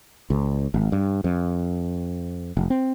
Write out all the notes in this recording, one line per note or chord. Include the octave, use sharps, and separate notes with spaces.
C#2
G#1
G2
F2
F1
C4